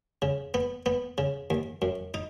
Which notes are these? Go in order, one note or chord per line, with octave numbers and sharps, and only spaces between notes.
C#3
B3
B3
C#3
D#2
F#2
D#4